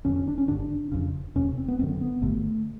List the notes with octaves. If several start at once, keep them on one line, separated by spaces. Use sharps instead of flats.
F1 F2 D3 C#4
C#4
D4
C#4
G#1 G2 D3 D4
F1 F2 C#3
E1 E2 C3 C#4
C4
B3
F#1 F#2 D3 C4
B3
G#1 G2 D3 A3